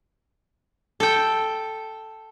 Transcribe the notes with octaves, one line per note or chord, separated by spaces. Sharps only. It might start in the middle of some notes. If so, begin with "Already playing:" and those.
A4 G5